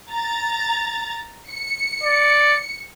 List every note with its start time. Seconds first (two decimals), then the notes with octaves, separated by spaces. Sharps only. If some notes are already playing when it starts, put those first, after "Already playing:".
0.10 A#5 A6
1.50 C#7
2.03 D5